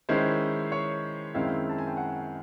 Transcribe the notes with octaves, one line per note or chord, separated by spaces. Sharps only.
D#3 G#3 C#4 E4 C5
C#5
F#2 D#3 G#3 C4 E4 F5
A5
G#5
G5
F#5